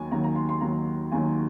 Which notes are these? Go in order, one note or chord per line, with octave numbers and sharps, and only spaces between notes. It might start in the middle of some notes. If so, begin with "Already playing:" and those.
Already playing: D#2 D#3 F#3 G#5
D#2 D#3 F#3 A#5
A#5
C6
C6
D#2 D#3 F#3 A#5
D#2 D#3 F#3 G#5